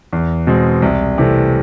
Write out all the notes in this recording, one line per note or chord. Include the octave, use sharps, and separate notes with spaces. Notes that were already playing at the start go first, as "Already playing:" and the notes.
E2
B2 G#3 C4
C2
C3 E3 A3